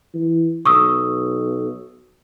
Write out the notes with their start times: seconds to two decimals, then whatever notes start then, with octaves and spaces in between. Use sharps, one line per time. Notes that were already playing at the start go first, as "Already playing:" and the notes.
0.15 E3
0.66 B1 C#6 D#6 E6